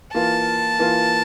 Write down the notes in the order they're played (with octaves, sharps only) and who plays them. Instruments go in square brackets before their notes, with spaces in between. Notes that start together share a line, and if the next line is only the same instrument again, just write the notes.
[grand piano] E3 A#3 F4 [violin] A5
[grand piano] E3 A#3 F4